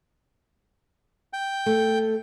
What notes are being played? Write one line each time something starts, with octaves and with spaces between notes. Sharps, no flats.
G5
A3 A4